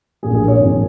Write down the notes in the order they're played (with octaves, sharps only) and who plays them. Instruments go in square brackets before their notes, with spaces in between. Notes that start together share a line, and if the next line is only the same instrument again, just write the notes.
[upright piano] A#1 A#2 A#3 G#4
G#4
A#4
C#5
G#1 G#2 F3 A#3